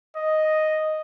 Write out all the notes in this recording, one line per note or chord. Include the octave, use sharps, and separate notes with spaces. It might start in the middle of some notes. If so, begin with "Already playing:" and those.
D#5